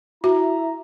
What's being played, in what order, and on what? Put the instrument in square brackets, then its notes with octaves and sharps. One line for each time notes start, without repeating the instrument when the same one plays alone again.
[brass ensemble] E4 E5 A#5 [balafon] F#4